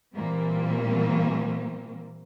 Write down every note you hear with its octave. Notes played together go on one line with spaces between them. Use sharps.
A#2 E3 G3 A#3 C4